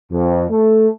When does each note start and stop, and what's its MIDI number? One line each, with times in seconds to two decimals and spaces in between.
0.11 0.44 41
0.50 0.87 57